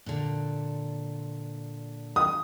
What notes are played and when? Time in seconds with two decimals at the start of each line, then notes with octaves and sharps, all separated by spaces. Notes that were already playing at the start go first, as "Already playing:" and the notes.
0.06 A#2 D3
2.16 D#6